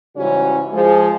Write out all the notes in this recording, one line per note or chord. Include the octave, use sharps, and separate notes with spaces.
G#2 C#3 E3 G3 C#4 F#4
F3 G#3 G#4